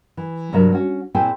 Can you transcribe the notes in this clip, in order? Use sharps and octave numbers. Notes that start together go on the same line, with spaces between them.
E3
G2 C3 F#3 A#4 E5
C#4 F#4
A#2 C4 E4 G#4 G5 G#5